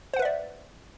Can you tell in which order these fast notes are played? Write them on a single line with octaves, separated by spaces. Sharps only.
C5 F#5 B4 E5 D5